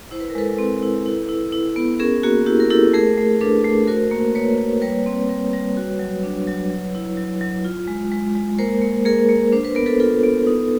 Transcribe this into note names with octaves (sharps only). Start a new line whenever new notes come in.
E4 C5
B4
A#4
G#3 A4 B4
C4
E4
E4
E4
E4
B3
C#4 G#4 A#4
A#3 F#4 G#4
E4 G4
A#4
E4 G4 A4
A3 G#4 A#4
A3
D4 A4 B4
A3
F#4 A#4 C5
A#3
A#3 B4 C#5
A#3
G3 B4 C#5
C4
G3
G3
F#4
F#3
D4
F#3
F#3
E4
F#3
F#3
F4
G#3
G#3
G#3
A#3 A#4 C5
A#3
A#3 G#4 A#4
A#3
D4 C5
B4
B3 A#4
A4 B4
F4 A4 B4
B3
D#4